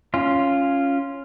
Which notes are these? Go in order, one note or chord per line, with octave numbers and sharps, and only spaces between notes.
C#4 F4